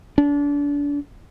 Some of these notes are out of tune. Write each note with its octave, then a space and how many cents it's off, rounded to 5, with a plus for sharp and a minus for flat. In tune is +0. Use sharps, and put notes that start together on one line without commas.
D4 -30